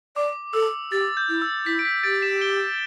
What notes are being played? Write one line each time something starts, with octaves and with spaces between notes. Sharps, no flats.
D5 D6
A4 E6
G4 A6
G6
E4
E6
E4 B6
D7
B6
G4 A6 D7
B6 E7
D7 G7